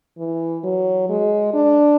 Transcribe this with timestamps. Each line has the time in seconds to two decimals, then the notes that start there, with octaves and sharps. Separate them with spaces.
0.18 E3
0.64 F#3
1.09 G#3
1.54 D4